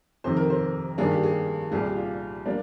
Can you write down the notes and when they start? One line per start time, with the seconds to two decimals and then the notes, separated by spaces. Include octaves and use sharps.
0.24 F2 C3 D#3 C5
0.37 A#4
0.50 C5
0.98 G2 D#3 A#3 D4 G#4
1.12 G4
1.23 G#4
1.72 C2 A#2 G3 G#4
1.84 G4
1.97 F4
2.46 G3 A#3 D4